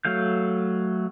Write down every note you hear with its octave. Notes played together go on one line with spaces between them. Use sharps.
F#3 A3 F5 G6